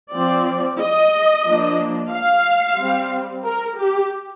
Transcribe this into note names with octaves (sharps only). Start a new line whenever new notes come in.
F3 C4 D5
D#5
F3 A#3 D4
F5
G3 C4
A#4
G4